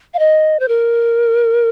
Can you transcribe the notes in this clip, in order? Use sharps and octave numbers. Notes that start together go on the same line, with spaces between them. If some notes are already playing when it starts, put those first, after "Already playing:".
F5
D#5
C5
A#4